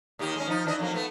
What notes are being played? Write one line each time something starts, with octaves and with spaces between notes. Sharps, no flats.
D#2 D#3 G4
G#3 C#4
F3 D#4
E3 D4 D#5
F2 F#3 A#3
A3 B3